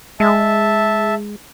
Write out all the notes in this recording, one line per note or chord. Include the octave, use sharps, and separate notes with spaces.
G#3 E5 A5